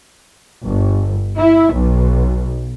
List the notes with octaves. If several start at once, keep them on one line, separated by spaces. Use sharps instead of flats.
G1
E4
B1